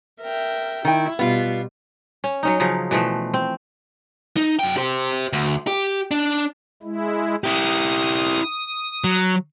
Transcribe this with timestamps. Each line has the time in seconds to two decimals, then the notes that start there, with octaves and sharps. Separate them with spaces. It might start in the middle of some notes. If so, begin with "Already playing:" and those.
0.20 A#4 E5 G5
0.85 D#3 E4 G5
1.19 B2 G3 B3 F4
2.24 C#4
2.43 F#3 C#4 D#4
2.60 C#3 F3 F#3
2.91 B2 E3 F3 A3
3.34 C4
4.37 D#4
4.59 F#2 G5
4.77 G4 C5
5.33 D2
5.67 G4
6.11 D4
6.83 G#3 E4
7.44 E4 G4 D#6
9.04 F#3